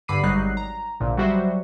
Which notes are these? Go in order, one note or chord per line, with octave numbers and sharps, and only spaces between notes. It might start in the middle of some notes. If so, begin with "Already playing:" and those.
G2 D3 B5 D6 C7 D#7
G#1 F#3 G3 D#4 F#6 C7
A#5
A#1 A#2 D3
F#3 G3 F#4 C5 E5